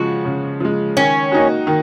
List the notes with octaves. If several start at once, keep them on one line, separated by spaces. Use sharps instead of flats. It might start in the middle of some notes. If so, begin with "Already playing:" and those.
Already playing: C#3 F3 G#3 F#4
C#3
F3 G#3
D#3 C#4
A#3 D#4 F#4
D#3